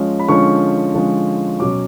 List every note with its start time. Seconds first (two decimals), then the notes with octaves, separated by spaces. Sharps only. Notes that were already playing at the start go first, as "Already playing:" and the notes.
Already playing: F3 G#3 C#4
0.20 B5
0.29 D3 F3 G#3 C#4 C#6
0.94 D3 F3 G#3 C#4
1.60 B2 F#3 C#4 D6